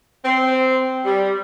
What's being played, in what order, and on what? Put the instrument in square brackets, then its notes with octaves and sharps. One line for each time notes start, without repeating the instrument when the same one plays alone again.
[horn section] C4
G3